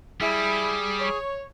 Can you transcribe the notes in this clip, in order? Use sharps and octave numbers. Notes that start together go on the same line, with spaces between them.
G3 E4 G#4
C#5